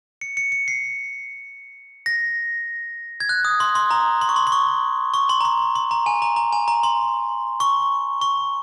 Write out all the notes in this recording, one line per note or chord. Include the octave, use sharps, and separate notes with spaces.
C#7
C#7
C#7
C7
A#6
G#6
F#6
D#6
C6
C6
A#5
C6
C#6
C6
C6
C#6
C#6
C6
A#5
C6
C6
A#5
G#5
A#5
A#5
G#5
A#5
C6
C#6
C#6